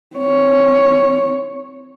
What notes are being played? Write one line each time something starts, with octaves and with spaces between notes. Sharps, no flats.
C4 C#5